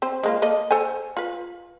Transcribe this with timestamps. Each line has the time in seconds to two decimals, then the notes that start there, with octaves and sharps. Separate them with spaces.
0.02 C4 C5
0.23 G#3 A#3 F4
0.42 A#3 A4 D#5
0.71 A4 C5 G#5
1.17 F4 B4